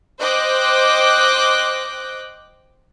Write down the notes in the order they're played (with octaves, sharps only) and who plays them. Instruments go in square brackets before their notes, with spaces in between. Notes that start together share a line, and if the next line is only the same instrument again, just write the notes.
[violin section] C5 D#5 G5 D6 F#6